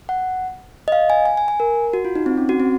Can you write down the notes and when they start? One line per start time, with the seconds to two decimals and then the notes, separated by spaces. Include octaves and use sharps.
0.09 F#5
0.88 D#5
0.92 F5
1.10 G#5
1.26 G#5
1.37 G#5
1.48 G#5
1.60 A#4
1.93 F#4
2.05 F4
2.16 D#4
2.26 C4
2.37 C#4
2.49 F#4
2.60 C4